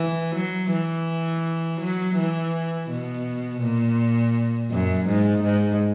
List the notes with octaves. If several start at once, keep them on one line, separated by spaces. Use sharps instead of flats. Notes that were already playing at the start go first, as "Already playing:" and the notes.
Already playing: E3
F#3
E3
F#3
E3
B2
A#2
F#2
G#2
G#2